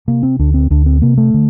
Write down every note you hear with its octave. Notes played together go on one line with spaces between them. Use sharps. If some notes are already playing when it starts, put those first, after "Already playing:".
C3 A#3
C4
D2 D4
C4
D2 D4
C4
C3 A#3
A3
D3